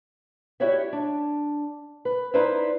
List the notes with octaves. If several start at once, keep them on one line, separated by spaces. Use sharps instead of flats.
E4 F#4 G4 C#5 D5 E5
D4
B4
D#4 E4 B4 C5 D5 E5